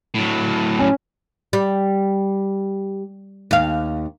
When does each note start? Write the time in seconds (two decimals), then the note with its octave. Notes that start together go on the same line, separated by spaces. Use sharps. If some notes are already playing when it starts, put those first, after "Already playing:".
0.14 A2 F#3
0.79 C#4
1.53 G3
3.51 D#2 F5